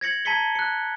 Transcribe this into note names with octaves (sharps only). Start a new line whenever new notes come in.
G#6 A#6 C#7 F#7
A5 A#5 G#6 B6 C#7 G7
F#6 C#7